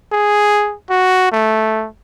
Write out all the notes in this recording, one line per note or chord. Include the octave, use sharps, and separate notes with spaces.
G#4
F#4
A3